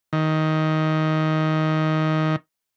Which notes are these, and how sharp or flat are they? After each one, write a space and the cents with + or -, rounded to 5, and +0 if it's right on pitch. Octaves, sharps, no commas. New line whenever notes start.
D#3 +10